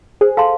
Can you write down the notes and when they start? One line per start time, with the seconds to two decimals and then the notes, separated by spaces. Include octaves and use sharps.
0.21 G#4 C5
0.37 A4 F5 A5 C6